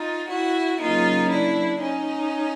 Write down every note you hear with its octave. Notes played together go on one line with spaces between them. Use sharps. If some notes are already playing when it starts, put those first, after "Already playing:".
Already playing: D#4 F4
E4 F#4
C#3 F#3 A#3 D#4 F4
D4 E4
C#4 D#4